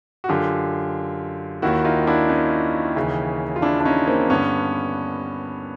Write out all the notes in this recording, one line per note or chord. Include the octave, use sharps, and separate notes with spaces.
F#4
F#2 D3 F4 G4
D#2 D#3 E4 F#4
D#4 F4
D4 E4
C#4 D#4
D#2 C#3 E3
F4
D4 E4
D4
C#4 D#4
A#3 C4
G2 D3 B3 C#4